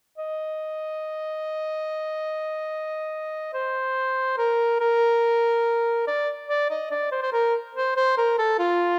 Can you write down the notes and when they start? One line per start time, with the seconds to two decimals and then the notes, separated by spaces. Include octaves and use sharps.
0.18 D#5
3.54 C5
4.38 A#4
4.80 A#4
6.07 D5
6.48 D5
6.70 D#5
6.91 D5
7.12 C5
7.22 C5
7.32 A#4
7.75 C5
7.96 C5
8.17 A#4
8.38 A4
8.59 F4